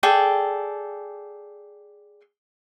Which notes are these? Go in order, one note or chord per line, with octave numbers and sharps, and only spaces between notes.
G#4 A4 D5 G5